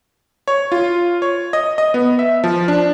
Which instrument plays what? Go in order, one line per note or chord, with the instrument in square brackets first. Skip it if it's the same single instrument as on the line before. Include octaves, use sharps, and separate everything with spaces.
[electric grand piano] C#5
F4
C#5
D#5
D#5
B3
E5
F3
D4